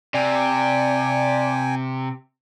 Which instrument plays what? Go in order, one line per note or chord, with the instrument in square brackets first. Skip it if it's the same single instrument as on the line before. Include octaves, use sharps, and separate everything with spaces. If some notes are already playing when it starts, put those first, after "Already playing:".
[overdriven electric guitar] C3 [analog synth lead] D5 [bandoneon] G5 G#5